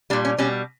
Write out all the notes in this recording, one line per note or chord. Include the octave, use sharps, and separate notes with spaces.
A#2 G3 D4
C#4
B2 G3 C#4